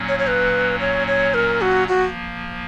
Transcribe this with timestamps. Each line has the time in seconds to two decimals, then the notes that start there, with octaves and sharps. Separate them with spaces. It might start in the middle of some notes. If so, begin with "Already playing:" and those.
Already playing: A#2 F#3 A#3 C#4
0.08 C#5
0.19 C#5
0.27 B4
0.80 C#5
1.07 C#5
1.34 A#4
1.61 F#4
1.88 F3 A#3 F#4